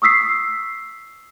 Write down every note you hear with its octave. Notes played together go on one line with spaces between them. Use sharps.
C#6 D#6 E6 B6 C7